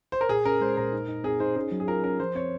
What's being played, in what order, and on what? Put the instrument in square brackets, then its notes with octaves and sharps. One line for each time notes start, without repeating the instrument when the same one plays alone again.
[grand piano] C5
A#4
[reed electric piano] A#2 [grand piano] G#4
[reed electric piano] C#4 [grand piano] A#4
[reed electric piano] G#3 [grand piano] C5
[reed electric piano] A#2 [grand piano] A#4
[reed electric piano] D#4
D#4
[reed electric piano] C4 [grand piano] G#4
[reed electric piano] D#4 [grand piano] C5
[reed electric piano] C#4 [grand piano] G#4
[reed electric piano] F#3
[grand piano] G#4
[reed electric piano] F4 [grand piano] A#4
[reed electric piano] C#4 [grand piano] A#4
[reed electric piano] F3 [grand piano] C5
[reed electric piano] C4 [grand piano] C#5